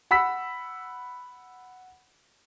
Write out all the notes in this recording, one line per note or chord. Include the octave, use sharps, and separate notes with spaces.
F#5 B5 E6 B6